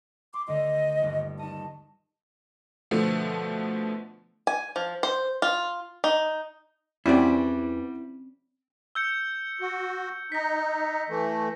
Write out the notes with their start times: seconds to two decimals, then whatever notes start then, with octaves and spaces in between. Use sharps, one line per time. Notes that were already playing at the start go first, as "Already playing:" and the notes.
0.34 C6 D6
0.48 D2 D3 D#5
1.02 G1 D#2
1.39 D#4 D#5 A5
2.91 B2 D3 F3 A3 B3
4.47 G#5
4.76 F3
5.03 C5
5.42 F4
6.04 D#4
7.06 E2 E3 G3 C4 C#4 E4 F#4 D5
8.95 E6 G6 C#7
9.60 F#4
10.32 D#4 A#6 B6
11.09 E3 A3